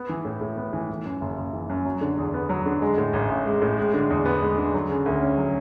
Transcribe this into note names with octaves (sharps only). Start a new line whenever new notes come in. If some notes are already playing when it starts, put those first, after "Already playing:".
Already playing: B3
E3
A2
A2
B3
E3
E3
F#2
F#1
F#1
E3
F#2
F#3
D3
E2
B3
F#3
D3
G#3
A2
A1
A1
G#3
A2
G#3
D3
E2
B3
G#3
D3
F#3
C#3
D2
C#4
F#3